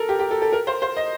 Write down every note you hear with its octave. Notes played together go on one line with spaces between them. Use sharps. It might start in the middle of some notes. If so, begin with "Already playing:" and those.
Already playing: A4 A#4
G4
G4
A4
A4
A#4
C5
C5
D#5